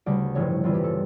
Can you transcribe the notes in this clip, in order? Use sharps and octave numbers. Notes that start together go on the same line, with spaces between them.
D2 C#3 G3 D5
A1 G2 F3 C#5
E2 E3 G3 F4
G4
A4